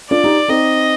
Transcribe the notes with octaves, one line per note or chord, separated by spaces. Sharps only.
D4 F4 D5
D#4 G4
C4 D#4 D#5